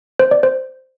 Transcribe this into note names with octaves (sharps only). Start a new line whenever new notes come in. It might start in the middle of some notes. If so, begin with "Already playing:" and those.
C5
D5
C5